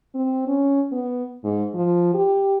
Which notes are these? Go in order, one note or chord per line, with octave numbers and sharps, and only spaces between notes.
C4
C#4
B3
G#2
F3
G4